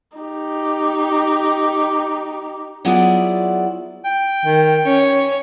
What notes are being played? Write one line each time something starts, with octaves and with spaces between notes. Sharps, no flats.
D#4 G4
F#3 B3 E4 F4 G#4 D5
G5
D#3
C#4 C#5